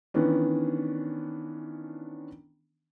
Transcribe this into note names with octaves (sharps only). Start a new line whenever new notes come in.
D#3 E3 B3 C#4 D4